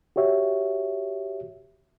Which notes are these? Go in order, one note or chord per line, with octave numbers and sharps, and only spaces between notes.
F#4 G4 C#5 E5